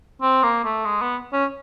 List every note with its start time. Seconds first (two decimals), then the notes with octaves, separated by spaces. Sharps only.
0.22 C4
0.43 A#3
0.65 A3
0.85 G#3
1.02 B3
1.33 C#4